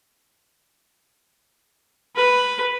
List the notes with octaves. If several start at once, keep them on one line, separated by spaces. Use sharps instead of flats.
B4